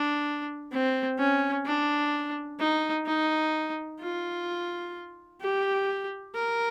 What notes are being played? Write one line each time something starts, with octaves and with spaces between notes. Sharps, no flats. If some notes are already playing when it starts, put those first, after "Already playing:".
Already playing: D4
C4
C#4
D4
D#4
D#4
F4
G4
A#4